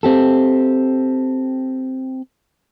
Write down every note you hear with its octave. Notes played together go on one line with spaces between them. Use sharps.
C4 G4 A4